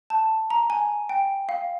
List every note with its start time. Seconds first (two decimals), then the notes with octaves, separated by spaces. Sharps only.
0.10 A5
0.50 A#5
0.70 G#5
1.09 G5
1.49 F5